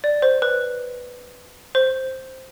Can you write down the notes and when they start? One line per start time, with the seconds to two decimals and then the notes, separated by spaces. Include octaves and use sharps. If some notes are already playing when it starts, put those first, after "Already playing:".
0.04 D5
0.22 C5
0.42 B4
1.75 C5